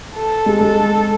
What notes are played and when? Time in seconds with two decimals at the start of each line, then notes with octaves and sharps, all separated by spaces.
0.16 A4
0.46 G#3
0.61 G#3 A4